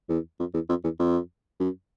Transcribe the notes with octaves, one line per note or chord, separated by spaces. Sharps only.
E2
F2
E2
F2
E2
F2
F#2